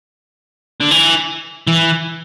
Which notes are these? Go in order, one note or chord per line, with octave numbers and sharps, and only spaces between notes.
D3
E3
E3